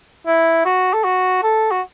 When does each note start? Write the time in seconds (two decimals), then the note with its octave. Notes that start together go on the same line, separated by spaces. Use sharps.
0.27 E4
0.65 F#4
0.94 A4
1.04 F#4
1.43 A4
1.71 F#4